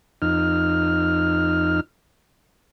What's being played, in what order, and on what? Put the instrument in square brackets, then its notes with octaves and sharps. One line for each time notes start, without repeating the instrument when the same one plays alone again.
[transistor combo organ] F2 D#4 F6